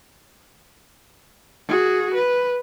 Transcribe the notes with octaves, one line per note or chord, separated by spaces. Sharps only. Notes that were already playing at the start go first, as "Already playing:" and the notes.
F#4 G#4
B4